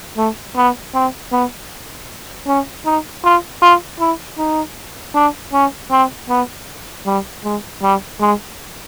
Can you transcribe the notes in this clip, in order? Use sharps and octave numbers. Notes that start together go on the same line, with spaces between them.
A3
B3
C4
B3
C#4
D#4
F4
F4
E4
D#4
D4
C#4
C4
B3
G3
G#3
G3
G#3